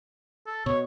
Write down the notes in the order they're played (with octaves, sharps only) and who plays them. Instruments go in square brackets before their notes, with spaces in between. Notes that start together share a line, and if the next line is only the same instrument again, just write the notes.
[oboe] A4
[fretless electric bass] B2 [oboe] C#5